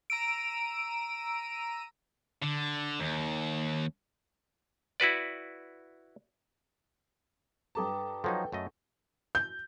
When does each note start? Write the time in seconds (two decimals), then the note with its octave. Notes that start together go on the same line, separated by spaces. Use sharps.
0.10 A#5 E6 D7 D#7
2.43 D3
3.00 D#2
5.00 E4 F#4 B4 D5
7.75 G2 A4 B4 G5 A5 A#5 D6 D#6
8.24 F3 F#3 D#4 A4
8.52 F#2 A3 D#5
9.35 G6